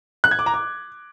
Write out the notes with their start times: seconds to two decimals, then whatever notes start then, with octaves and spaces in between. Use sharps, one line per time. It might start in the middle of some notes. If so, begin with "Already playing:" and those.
0.24 F#6
0.31 G#6
0.39 D6
0.46 A#5
0.54 D6